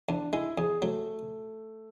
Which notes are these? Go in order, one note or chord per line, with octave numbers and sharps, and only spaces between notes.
E2 D4
G#3 E4
E2 G#4
F#3 A3